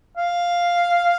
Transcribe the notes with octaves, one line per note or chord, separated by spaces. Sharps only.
F5